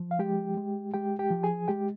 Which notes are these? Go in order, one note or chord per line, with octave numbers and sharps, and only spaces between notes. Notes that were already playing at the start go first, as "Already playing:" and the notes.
Already playing: F3
F5
G#3 G4 G5
G#3
G#3 G4 G5
G4 G5
F3
G#4 G#5
G#3 G4 G5